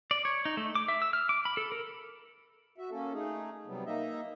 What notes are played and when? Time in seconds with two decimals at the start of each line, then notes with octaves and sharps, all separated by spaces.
0.11 D5
0.25 C#5
0.45 D#4
0.57 A3
0.75 D6
0.88 E5
1.02 E6
1.13 F6
1.29 D6
1.45 B5
1.57 A4
1.72 A#4
2.78 F#4 E5
2.91 A#3 C#4 A4
3.13 A3 D#4 G#4
3.67 C3 F#3 G3 B3
3.86 A#3 D#4 D#5 E5